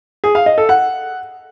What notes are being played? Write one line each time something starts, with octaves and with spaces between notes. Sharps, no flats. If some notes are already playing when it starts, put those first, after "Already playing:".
G#4
F5
D#5
A4
F#5